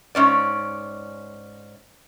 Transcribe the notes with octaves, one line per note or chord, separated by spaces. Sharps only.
G#2 C#4 D5